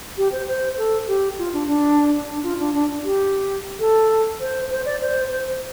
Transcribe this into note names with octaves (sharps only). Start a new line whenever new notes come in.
G4
C5
C5
A4
G4
F4
D4
D4
D4
F4
D4
D4
G4
A4
C5
C5
D5
C5
C5